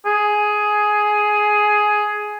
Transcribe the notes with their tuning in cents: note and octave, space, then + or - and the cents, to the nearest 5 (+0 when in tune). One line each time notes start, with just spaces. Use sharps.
G#4 +10